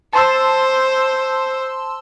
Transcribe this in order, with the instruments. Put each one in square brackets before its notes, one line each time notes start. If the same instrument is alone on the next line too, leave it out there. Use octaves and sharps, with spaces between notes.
[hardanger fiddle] C5 [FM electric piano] A5 C6 E6